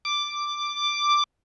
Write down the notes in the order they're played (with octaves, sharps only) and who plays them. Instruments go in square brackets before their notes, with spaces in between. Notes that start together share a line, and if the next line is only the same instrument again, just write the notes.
[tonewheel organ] D6